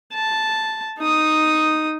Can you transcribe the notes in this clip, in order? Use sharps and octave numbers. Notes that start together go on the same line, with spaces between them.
A5
D#4 D#6